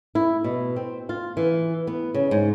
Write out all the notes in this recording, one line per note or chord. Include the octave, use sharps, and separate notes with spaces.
E4
B2
C4
F4
E3
B3
C#3
G#2